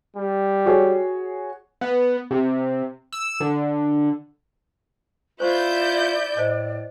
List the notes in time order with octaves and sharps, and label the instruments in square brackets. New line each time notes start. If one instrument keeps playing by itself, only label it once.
[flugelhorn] G3
[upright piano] F#4 G#4 C#5
[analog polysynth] B3
C3
E6
D3
[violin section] E4 G6 [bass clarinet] F4 [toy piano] C5 C#6 [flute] D5
[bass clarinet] A2 [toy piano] C5 D#5